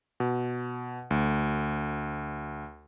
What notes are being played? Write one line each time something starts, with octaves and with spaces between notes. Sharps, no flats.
B2
D2